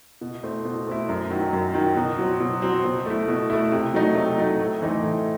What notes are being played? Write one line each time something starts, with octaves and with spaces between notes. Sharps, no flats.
B2
A3 C4 E4
B2
A3 C4 E4
F#2
D#3 F#3
F#2
D#3 F#3
B2
F#3 C4
B2
F#3 C4
B2
A3 E4
B2
A3 E4
C3
F#3 A3 D#4
C3
F#3 A3 D#4
A2
E3 A3 C4 D#4
A2